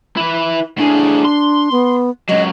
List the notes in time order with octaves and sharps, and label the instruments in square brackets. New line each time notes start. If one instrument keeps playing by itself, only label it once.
[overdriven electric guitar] E4 B4
[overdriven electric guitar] A2 G#4 [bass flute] D4
[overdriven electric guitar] C6
[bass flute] B3
[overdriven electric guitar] C#2 F#3 [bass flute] D#5